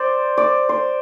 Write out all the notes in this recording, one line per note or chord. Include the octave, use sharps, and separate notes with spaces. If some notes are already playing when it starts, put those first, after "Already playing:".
Already playing: C5 D5
D5
C5